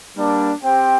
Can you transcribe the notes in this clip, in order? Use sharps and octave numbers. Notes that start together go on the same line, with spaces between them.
G3 A#3 D4
C4 G4 C5 G5